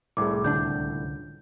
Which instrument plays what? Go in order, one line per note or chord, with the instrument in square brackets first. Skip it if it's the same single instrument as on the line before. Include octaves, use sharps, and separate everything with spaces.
[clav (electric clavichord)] C2 A2 [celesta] G#4 D6
[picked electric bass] C#2 D3 D4 [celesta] G6